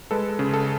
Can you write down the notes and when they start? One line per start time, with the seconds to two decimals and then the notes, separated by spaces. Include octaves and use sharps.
0.11 G#3 A4 B4
0.39 C#3
0.53 A4